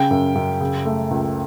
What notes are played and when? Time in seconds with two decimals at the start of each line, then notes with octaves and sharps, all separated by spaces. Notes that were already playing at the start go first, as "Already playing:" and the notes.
Already playing: C#3 G5
0.11 F#2
0.35 F#2
0.61 C#3
0.85 A3
1.11 C#2